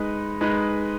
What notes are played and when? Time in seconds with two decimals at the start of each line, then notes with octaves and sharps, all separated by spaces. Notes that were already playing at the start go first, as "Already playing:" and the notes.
Already playing: G#3 D#4 B4
0.41 G#3 D#4 B4